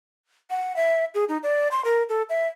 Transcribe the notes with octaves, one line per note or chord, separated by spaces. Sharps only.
F#5
E5
G#4
D#4
D5
C6
A#4
A4
E5